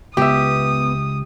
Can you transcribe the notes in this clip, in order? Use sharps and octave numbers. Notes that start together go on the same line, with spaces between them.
C#2 B3 G4 E5 D#6